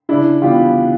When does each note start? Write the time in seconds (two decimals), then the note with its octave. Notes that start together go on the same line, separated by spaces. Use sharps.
0.09 C#3 D4 E4
0.42 E3 G3 B3 F4 G4